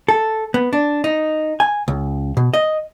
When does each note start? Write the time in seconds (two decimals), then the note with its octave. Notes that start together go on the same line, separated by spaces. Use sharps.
0.08 A4
0.54 B3
0.73 D4
1.04 D#4
1.60 G#5
1.88 C#2
2.37 B2
2.54 D#5